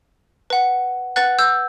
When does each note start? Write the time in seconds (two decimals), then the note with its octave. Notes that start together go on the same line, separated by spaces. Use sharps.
0.50 B4 F#5
1.16 B4 F#5 F#6 A6
1.39 E6 G6